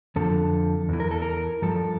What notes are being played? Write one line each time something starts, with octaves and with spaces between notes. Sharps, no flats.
F2 D3 F3 A4
E2 E3
A#4
A4
A#4
G2 F3 A4